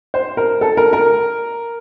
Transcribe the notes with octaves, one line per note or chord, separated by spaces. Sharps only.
C5
A#4
A4
A#4
A#4